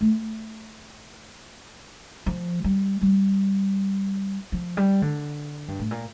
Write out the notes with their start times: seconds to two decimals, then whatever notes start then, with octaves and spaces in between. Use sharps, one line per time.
0.01 A3
2.26 F3
2.64 G3
3.01 G3
4.52 F3
4.77 G3
5.02 D3
5.68 G2
5.80 A2
5.91 A#2